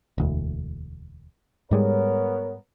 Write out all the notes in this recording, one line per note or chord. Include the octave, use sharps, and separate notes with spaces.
E1 D2
G#2 G3 G#3 B3 A#4 C#5